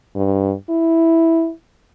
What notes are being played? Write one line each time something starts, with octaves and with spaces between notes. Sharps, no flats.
G2
E4